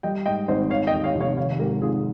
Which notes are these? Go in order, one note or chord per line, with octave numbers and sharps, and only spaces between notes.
G3 D#5 G5
G#2 D#5 G5
G#1 C5 D#5
D#3 C#5 F5
D#5 G5
D#2
C#5 F5
F1
C#5 F5
D#3 C#5 F5
G#2 G4 A#4
G#1 F4 G#4